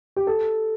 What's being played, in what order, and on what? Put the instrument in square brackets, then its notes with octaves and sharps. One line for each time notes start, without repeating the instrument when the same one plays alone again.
[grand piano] G4
A4